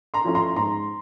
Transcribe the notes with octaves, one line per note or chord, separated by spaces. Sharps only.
A#5 C6
F3 A3 C#4 E4
A#5 C6
G#2 A#5 C6